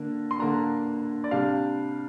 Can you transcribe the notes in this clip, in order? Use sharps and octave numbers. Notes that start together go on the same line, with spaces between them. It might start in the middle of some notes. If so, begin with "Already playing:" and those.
Already playing: D3 A#3 D4
C6
D3 A#3 D4 A#5
D5
C3 G3 D4 F5